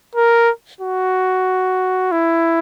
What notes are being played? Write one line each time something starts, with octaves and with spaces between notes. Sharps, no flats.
A#4
F#4
E4